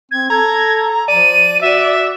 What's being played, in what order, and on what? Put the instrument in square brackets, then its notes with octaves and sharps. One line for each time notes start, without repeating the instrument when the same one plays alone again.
[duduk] C4 [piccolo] G#6
[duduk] A4 [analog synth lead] A#5 [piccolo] G#6
[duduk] F3 [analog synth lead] D5 [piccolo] D#7
[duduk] F#4 [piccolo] E5